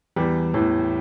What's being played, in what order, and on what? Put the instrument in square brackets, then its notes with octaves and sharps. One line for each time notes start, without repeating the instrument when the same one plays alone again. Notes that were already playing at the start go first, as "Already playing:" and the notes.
[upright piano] E2 E3 [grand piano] G3
[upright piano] E2 E3 [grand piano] A2